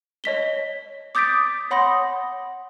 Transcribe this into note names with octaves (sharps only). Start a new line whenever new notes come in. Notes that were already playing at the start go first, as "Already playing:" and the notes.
C#5 D#5 B6 G7
D6 D#6 G6 A6 B6 D7
C#5 F#5 B5 C6 D#6 A#6